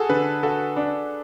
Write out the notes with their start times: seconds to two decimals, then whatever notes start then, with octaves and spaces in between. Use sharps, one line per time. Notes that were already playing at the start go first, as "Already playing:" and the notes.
Already playing: F#4 G#4 A4
0.09 D3 B4
0.43 F#4 A4
0.76 D4